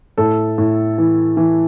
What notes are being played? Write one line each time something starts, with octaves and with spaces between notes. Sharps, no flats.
A2 A4
A2
E3
E3